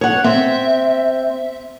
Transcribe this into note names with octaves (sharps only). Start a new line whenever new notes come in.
C#5 F#5
C4 E5